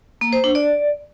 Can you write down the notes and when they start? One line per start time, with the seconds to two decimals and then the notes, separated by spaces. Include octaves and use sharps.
0.21 A#3
0.33 C5
0.44 D4
0.55 D5